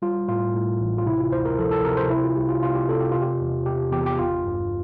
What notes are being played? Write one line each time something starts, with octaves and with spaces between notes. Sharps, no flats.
G3 F4
A2 F4
A2
A1
F4
C3 E4
F4
D2 C5
A#4
F3 A4
A4
C3 A#4
C5
C3 E4
F4
C2 G4
F4
C3 F4
G4
C3 A4
G4
C3 F4
G4
E2
C3 G4
E2 G4
G4
G1 F4
G2